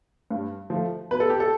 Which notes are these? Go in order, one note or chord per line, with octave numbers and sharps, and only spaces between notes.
G2
F3 A3
B2 B4
A4
G4
A4